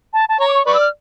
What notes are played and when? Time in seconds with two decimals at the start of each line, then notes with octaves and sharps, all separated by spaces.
0.13 A5
0.29 A5
0.40 C#5 A#5
0.48 D6
0.54 C#6
0.67 B4 D5 C#6
0.74 E6
0.80 F6